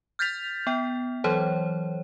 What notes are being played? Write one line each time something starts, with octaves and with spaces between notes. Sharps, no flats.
F6 G6 A6 B6 F7
B3 G5
E3 F#3 C5 C#5